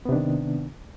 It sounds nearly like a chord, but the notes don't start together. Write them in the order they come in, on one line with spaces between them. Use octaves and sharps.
B3 C3 D4 D#3